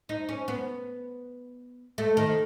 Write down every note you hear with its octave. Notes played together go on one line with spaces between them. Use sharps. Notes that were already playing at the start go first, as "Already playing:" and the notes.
D#4
C#4
B3
A3
D#3